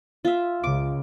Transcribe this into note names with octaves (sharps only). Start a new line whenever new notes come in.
F4 E5
C#2 D6